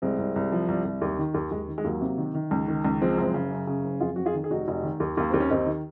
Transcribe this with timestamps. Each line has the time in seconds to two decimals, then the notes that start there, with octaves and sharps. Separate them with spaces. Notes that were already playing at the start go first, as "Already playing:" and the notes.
0.02 C2 G#3 C4
0.18 C2
0.36 C2
0.52 F3
0.68 C2
0.85 C2
1.02 D#2
1.19 D#3
1.34 D#2
1.51 D#2 G#3
1.68 D#3
1.78 G#3
1.84 D#2 F#3 A#3
2.01 C3
2.18 D#3
2.35 D#3
2.51 C#2
2.68 D#3
2.85 C#2
3.01 F3 G#3 C4
3.18 F#1
3.34 C#3
3.51 F#2
3.67 C#3
3.85 F#1
4.00 F2 F4 G#4
4.16 F2 F#4
4.26 F4 G#4
4.34 D#3
4.44 G#4
4.51 F1 D#4 F#4
4.68 F1
4.83 D#3
5.00 D#2
5.17 D#2 A#3
5.30 D#2 C4
5.40 C#4
5.50 D#2 C4 D#4
5.66 D#3